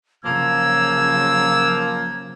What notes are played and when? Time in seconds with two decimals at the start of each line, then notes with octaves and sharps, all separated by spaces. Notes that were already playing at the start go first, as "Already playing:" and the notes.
0.24 C#3 F3 F#3 A#3 E6 G#6